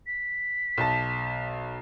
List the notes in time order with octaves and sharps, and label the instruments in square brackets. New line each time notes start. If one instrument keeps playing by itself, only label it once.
[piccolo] B6
[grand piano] B1 A5